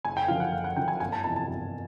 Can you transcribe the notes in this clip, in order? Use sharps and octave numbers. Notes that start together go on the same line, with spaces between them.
F#1 G#5
G5
F#2 D3 F3 F5
F#5
F#1 F5
F#5
F#2 D3 F3 G5
G#5
G1 G#5
A5
F2 C3 E3 A5
A5
G1